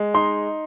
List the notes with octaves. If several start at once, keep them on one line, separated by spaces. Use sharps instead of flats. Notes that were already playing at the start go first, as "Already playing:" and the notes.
Already playing: G#3
D#4 C6